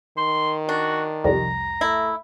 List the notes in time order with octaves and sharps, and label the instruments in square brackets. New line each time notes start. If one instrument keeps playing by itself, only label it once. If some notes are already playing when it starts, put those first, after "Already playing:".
[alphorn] D#3 [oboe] C6
[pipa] D4 [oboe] F#4
[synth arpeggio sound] C2 F2 G3 [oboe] A#5
[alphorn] A3 [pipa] E4